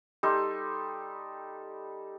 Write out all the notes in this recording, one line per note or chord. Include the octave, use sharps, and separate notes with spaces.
G3 D#4 A4 C6